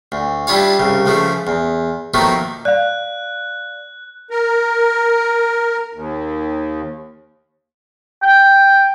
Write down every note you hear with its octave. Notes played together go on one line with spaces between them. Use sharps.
D2
G3 D4 E4 F4 C#5 F5
C2 C#3
C#2 C#3 F3 A3
E2
B2 D#3 F3 F#3 A3 A#3
D5 F5 F#6
A#4
D#2
G5